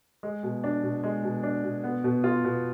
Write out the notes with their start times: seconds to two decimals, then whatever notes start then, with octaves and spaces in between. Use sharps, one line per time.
0.23 G#3
0.43 B2
0.64 D4
0.83 B2
1.04 G#3
1.24 B2
1.43 D4
1.63 B2
1.84 B3
2.04 B2
2.24 F4
2.44 B2